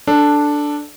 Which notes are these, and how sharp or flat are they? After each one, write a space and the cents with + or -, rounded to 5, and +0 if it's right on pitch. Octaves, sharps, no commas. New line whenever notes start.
D4 +0 A4 +0